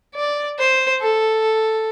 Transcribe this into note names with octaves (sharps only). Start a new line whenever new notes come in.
D5
C5
A4